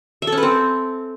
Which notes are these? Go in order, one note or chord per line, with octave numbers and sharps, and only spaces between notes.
E5
A4
C#4
B4
C4